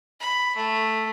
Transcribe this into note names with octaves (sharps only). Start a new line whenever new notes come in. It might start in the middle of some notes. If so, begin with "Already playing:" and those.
B5
A3